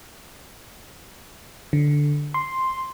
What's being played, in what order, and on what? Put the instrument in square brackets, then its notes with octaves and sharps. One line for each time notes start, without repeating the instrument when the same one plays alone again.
[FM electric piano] D3
C6